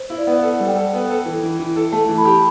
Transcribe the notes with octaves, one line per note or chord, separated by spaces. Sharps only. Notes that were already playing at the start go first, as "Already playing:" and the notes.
Already playing: C5
E4
D5
B3
A4 F#5
G3
G5
A4
B3
A4
E3
E3
E3
A4
A3 A5
E3
B5
G4